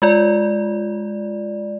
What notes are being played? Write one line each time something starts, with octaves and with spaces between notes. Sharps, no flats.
G#3 F4 D5